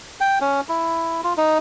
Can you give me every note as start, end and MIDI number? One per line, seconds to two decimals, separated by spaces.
0.21 0.39 79
0.41 0.61 61
0.69 1.21 64
1.24 1.33 65
1.37 1.58 63